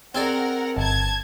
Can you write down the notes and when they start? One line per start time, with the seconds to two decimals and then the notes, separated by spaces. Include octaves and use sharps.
0.15 C4 G#4 A#4 D5 F#5
0.76 G1 A5 G#6